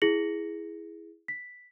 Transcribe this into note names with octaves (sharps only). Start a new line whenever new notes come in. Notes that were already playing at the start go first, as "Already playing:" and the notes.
E4 G#4 A#6 C#7 F#7
B6